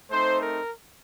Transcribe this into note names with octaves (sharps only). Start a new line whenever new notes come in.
A3 C4 D#4 C5
A#4